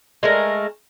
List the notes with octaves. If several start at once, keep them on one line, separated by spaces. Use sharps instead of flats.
G#3 A3 A#4